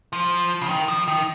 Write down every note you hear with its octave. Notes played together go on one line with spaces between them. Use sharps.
F3
C#3
D#3
F3
D#3